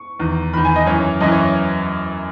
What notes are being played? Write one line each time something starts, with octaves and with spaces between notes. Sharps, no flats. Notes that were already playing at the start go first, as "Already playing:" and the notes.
Already playing: C#6
E2 D#3
E2 D#3 B5
G#5
D#5
F#2 E3 C#5
F#2 E3 D#5
C#5